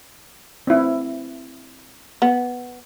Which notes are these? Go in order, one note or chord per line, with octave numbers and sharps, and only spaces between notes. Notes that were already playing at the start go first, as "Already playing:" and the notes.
C4 E4
B3